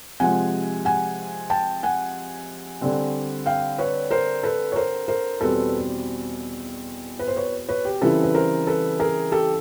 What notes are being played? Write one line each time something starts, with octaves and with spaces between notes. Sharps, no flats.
C3 F3 G#3 F#5 G#5
F#5 G#5
G5 A5
F#5 G#5
D3 G3 C4
F5 G5
B4 C#5
A#4 C5
A4 B4
C#5
A#4 C5
A#4 C5
E2 B2 G3 C4 A4 B4
B4
C5
B4 C#5
B4 C#5
G4
C#3 E3 G3 C4 E4 A4 B4
B4
A#4 C5
A4 B4
G#4 A#4
G4 A4